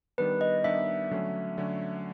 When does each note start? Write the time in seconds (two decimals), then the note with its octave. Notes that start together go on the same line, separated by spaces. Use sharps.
0.18 D#3 G3 B3 D4 B4
0.41 D#5
0.64 D#3 G3 B3 D4 E5
1.11 D3 F#3 A3 C#4
1.58 D3 F#3 A3 C#4